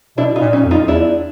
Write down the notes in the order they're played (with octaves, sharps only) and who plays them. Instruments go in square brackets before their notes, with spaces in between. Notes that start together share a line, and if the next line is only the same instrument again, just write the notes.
[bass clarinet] B2 [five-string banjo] D4 E4
[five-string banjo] D#4 F4
[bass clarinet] A#2
[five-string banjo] C#4 D#4
[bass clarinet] F2
[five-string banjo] D#4 F4
[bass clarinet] E2 [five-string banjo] D4 E4